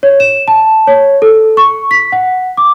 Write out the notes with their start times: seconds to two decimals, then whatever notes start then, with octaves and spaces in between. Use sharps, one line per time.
0.03 C#5
0.20 E7
0.48 A5
0.87 C#5
1.22 A4
1.57 C#6
1.91 B6
2.12 F#5
2.57 D6